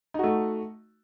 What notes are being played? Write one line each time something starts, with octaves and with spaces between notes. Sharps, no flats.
A3 D#4 F#4